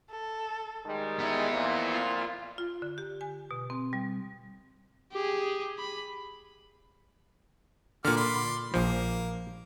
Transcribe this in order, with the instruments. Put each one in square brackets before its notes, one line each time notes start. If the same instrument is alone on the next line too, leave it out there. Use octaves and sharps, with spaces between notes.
[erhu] A4
[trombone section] D#3 G3 G#3
[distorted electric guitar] B3 E4 [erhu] D#4
[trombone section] F2 A#2
[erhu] F4
[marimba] F4
D3
G4
G#5
B2
C4
G3
[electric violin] G4 G#4
B5
[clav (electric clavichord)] A#2 D3 [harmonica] F#4 D6 F6
[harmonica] D5 B5 C6
[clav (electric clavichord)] A#1 F3 [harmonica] A#3